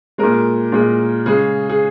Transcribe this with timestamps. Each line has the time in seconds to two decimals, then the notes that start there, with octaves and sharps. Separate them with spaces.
0.18 A#2 G#3 A#4
0.72 A#2 G#3
1.26 C#3 G#3 G#4
1.70 G#4